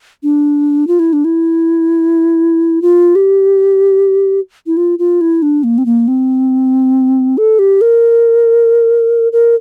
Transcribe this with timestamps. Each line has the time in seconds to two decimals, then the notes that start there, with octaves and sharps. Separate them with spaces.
0.23 D4
0.87 F4
0.99 E4
1.13 D4
1.25 E4
2.82 F4
3.15 G4
4.67 E4
4.77 F4
4.99 F4
5.21 E4
5.42 D4
5.64 A#3
5.78 C4
5.86 A#3
6.08 C4
7.38 A4
7.59 G4
7.81 A#4
9.32 A#4